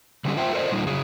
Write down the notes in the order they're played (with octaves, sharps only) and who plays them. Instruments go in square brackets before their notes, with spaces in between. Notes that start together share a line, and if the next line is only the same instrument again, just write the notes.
[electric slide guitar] D3 F#3 G3 C#4 G4 A4
F4 C5 E5 G5
A4 A#4 C5 D5 D#5
A#2 D3 G3 A#3 D#4 F4
C#3 F#3 G#4